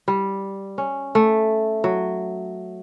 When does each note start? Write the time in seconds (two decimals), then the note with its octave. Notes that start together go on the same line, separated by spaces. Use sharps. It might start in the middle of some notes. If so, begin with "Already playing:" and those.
0.08 G3
0.78 C#4
1.15 A3
1.84 F#3